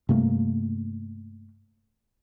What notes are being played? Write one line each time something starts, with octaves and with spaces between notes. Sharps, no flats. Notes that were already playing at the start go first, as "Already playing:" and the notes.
G2 C3 A3 A#3